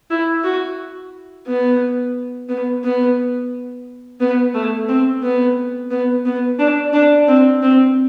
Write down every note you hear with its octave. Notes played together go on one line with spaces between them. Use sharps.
E4
F#4
B3
B3
B3
B3
A3
C4
B3
B3
B3
D4
D4
C4
C4